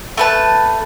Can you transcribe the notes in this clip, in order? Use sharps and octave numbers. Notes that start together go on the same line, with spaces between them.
A3 B4 A5